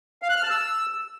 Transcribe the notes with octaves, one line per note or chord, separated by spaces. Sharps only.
F5
F#6
F6
A5
E6